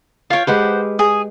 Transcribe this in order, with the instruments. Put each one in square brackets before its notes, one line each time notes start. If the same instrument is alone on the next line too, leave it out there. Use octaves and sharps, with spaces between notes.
[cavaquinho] F4 C#5 [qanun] F5 G5
[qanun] G#3 G4 B4 [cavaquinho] C5 F#5
[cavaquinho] G#4